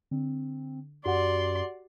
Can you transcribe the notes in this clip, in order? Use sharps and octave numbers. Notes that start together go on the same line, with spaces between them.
D3 C4
F#2 F#4 G4 D5 F#5 C6